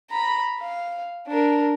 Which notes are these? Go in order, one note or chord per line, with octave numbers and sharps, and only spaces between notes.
A#5 B5
F5
D4 A#4